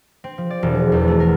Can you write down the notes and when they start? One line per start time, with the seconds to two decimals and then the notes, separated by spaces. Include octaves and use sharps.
0.24 C4
0.38 F3
0.50 D5
0.63 E1
0.74 G#4
0.92 E2
1.08 A3
1.20 A#4